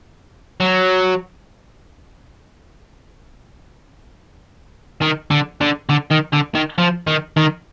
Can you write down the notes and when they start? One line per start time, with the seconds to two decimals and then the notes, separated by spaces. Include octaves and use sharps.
0.60 F#3
5.02 D#3
5.31 D3
5.61 D3
5.89 D3
6.11 D#3
6.33 D3
6.55 D#3
6.78 F3
7.07 D#3
7.37 D#3